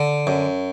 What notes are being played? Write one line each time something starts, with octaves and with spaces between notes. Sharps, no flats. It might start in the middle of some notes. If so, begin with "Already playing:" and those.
Already playing: D3
F#2